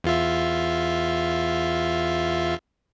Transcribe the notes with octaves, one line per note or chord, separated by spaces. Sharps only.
E2 F4 E5